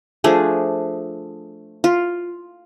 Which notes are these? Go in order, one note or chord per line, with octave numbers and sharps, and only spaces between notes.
F3 A3 D4 G#4
F4